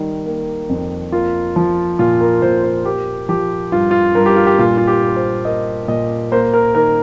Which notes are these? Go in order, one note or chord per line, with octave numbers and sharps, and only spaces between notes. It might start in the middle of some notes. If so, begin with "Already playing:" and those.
Already playing: D#3 G3
A#3
F2
A#3 F4
F3
A#2 F4
A#4
A#2 C5
C5
A#3 G4
F3 G4
G2 F4
F4
G2 A#4
G4
F4
G4
A#2 F4
F4
G4
A#3
C5
A#3 D#5
A#2 D#5
A#3 C5
A#4
D#3 A#4